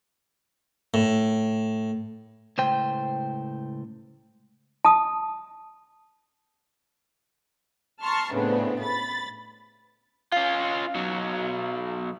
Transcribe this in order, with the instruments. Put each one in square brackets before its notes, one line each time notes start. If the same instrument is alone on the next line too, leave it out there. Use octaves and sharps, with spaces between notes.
[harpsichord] A2
[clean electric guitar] C#2 A2 C5 G5
[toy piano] A5 D#6
[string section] A5 A#5 C6 C#6 F6
A2 C#3 A3 B3 C4 D4
B5 A6
[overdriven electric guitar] C#4 F4 [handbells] F5
[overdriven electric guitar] B1 F#3